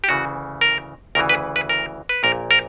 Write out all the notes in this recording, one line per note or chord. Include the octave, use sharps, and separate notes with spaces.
G4
D2 C#3 E3 F#4
A#4
D2 C#3 E3 A#4
B4
B4
A#4
B4
A#1 A#2 A#4
A#4